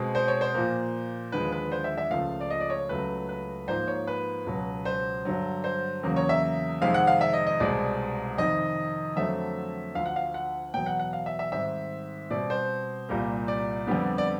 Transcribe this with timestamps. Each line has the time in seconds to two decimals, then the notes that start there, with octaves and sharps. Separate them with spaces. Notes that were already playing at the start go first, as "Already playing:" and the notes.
Already playing: B2 G#3 C4
0.15 C5
0.28 C#5
0.41 C5
0.54 A#2 F3 A#3
1.32 D#2 D3 F3 G#3 B4
1.52 B4
1.72 C5
1.84 E5
1.98 E5
2.11 C#2 C#3 F3 A3 F5
2.41 D5
2.50 D#5
2.60 D5
2.70 C#5
2.89 C#2 C#3 F#3 A3 B4
3.29 B4
3.68 G#2 F3 A#3 C5
3.87 C#5
4.07 B4
4.46 C#2 B2 F#3
4.85 C5
5.25 G2 D3 F#3
5.64 C5
6.03 E2 C#3 F#3 A#3
6.16 C#5
6.29 E5
6.81 F2 C3 D#3 G#3 C4 F5
6.94 F#5
7.07 F5
7.21 E5
7.33 D#5
7.47 D#5
7.60 C2 B2 G#3 C4 D5
8.38 F2 C3 D#3 D#5
9.16 F2 D3 F#3 A3 C4 E5
9.95 D2 D3 F3 F5
10.06 F#5
10.16 F5
10.34 F#5
10.73 E2 B2 F#3 B3 G5
10.86 F#5
10.99 F#5
11.13 F5
11.26 E5
11.39 E5
11.52 G#2 D#3 G3 C4 E5
12.30 B2 G3 C4 D5
12.50 C5
13.09 C2 A#2 G3 A#3
13.48 D5
13.87 F2 D3 G3 B3
14.18 D5